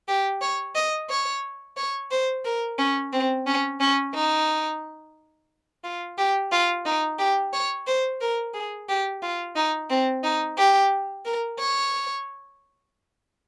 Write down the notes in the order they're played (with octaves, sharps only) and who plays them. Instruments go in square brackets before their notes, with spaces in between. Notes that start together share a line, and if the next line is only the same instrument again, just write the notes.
[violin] G4
C#5
D#5
C#5
C#5
C5
A#4
C#4
C4
C#4
C#4
D#4
F4
G4
F4
D#4
G4
C#5
C5
A#4
G#4
G4
F4
D#4
C4
D#4
G4
A#4
C#5